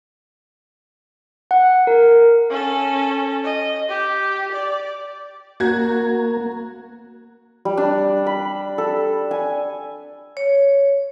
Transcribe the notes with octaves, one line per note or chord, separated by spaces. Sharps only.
F#5
A#4
C#4 A4
D#5
G4
D5
A#3 F#4 G#6
G3
D4
B5
A4
G#5
C#5